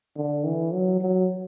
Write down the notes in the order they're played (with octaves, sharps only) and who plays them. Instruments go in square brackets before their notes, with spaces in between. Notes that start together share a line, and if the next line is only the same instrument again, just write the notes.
[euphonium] D3
E3
F#3
F#3